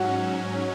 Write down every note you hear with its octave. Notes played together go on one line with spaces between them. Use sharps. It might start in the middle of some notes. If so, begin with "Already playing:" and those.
Already playing: G#2 F#3 C#4 F#4